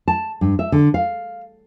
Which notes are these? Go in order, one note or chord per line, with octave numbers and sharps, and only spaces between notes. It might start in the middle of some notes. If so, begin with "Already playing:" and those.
A5
G2
E5
D3
F5